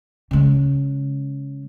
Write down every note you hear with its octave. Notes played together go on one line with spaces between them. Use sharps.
C#3 G#3